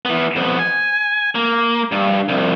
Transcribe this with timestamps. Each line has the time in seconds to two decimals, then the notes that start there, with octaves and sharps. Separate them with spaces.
0.05 E3 B3
0.36 F2 B3
0.59 G#5
1.35 A#3
1.92 G2
2.28 C2 F2